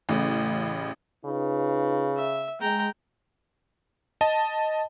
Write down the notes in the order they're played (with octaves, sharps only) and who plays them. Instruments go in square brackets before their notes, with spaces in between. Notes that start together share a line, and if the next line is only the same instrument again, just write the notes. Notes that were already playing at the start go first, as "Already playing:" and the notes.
[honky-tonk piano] A1 A2 C#3
[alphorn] C#3 [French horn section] D#4 F4 B4
[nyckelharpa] E5
[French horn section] G#3 [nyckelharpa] G5 A#5
[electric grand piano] D#5 A5